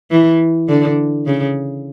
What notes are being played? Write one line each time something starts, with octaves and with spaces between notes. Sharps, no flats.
E3
D3
C#3